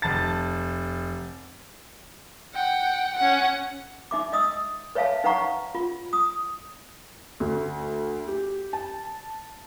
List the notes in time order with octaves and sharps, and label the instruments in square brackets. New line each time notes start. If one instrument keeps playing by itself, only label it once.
[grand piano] F1 A5 A6
[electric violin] F#5 G5
C#4 F#5
[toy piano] D#4 E5 D6
D#5 D#6 E6
B4 C#5 E5 F5 A5
D#4 B4 F5 F#5 A#5 C#6
F4
D#6
[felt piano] D2
G4
A5